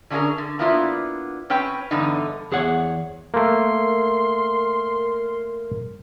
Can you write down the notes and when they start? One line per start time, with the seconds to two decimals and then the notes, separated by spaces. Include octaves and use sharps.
0.10 D3 C#4 D4 E4 G#4 A#4
0.38 D3
0.59 A#3 B3 D4 E4 F4
1.50 C4 C#4 B4 G5
1.91 E2 G2 D3 B3 D#4
2.52 E2 G#4 C#5 F#5
3.34 A3 A#3 A#4 C6